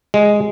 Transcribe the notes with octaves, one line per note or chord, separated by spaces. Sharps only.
G#3